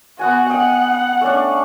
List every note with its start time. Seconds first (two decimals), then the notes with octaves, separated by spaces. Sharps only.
0.19 B3 F#4 F#5 G#5
0.50 D#5 F#5 G5
1.21 A3 C#4 D4